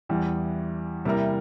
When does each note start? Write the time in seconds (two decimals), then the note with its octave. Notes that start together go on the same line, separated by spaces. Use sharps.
0.09 E2 E3 G3
1.05 C3 G3 A#3 E4 A#4